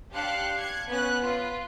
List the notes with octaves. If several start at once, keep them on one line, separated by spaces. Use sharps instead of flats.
D4 G4 F5 C6 F#6 C#7
F#6 G#6 C#7
B3 C#4 F#6
F4 B4